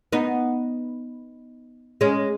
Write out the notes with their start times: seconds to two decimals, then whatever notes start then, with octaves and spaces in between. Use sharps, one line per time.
0.12 B3 D#4
2.01 G#3 C#4